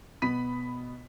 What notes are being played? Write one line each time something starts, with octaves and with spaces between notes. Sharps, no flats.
B2 B3 B5 B6 D#7